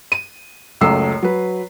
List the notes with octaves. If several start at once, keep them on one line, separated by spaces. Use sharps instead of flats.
D#7
F#1 C#2 F#2 A3 E6 C7
F#3 B4